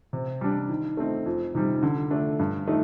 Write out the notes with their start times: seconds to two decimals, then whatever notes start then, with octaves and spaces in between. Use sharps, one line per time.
0.13 C3
0.41 G3 D4
0.69 D#3
0.97 A3 C4 D#4
1.26 F2
1.55 C3 D#3 G3
1.83 D3
2.10 A3 D4
2.39 G2
2.67 D#3 A3 D#4